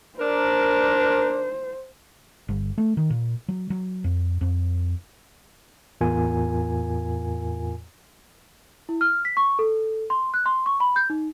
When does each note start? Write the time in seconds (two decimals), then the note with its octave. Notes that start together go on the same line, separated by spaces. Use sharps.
0.19 D4 A#4 C5
2.49 G1
2.78 A3
2.97 D#3
3.10 A#2
3.48 F#3
3.70 F#3
4.04 F2
4.41 F2
6.01 E2 A2 F4 A#4 G#5
8.89 E4
9.01 F6
9.25 B6
9.37 C#6
9.59 A4
10.10 C6
10.34 F#6
10.46 C6
10.66 C#6
10.80 B5
10.96 G6
11.10 D#4